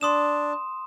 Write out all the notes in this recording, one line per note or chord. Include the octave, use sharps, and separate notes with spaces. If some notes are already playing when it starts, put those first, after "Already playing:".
D4 C6 D#6 E7